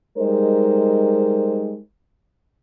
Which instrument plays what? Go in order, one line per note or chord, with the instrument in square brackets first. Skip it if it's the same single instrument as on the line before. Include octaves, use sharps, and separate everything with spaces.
[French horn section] G3 G#3 D#4 A#4 C5